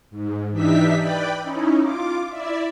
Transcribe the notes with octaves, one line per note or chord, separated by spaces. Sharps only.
G#2
E3 D4 D#4 G4 E5 B6
B4 D5 G5 B5
C#4 D#4 E4
F4 D6
E4 D5 E5